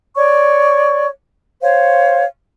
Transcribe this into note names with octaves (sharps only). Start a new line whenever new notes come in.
C#5 D5 C#6
C5 C#5 F5